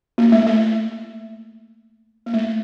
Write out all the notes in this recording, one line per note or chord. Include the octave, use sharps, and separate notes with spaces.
A#3
A3
A3
A#3
A3